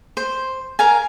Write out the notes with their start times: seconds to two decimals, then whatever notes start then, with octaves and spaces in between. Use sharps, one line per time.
0.17 C5
0.79 A#4 F5 G#5